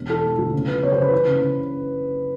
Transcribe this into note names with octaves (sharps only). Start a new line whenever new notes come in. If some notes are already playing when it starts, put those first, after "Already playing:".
Already playing: E1
E3 A4
E1
D2
C#3
F2 B4
F#1 C#5
C5
C#3 B4
E3
C#3
C#3